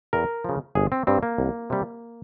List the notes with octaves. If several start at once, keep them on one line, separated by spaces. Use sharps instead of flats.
E2 A#4
C#3 F3
G1 G#4
C4
G2 G3 C4
A#3
C2
C3 G3